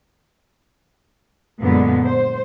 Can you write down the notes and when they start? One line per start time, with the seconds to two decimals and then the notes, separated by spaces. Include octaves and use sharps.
1.62 F#2 A#2 D3 G#3 B3
2.06 C5